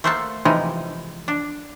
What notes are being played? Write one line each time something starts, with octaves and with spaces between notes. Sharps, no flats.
A3 A#3 C5 E5 F#5 A5
C3 E3 F3 G#3 D#4 D5
D4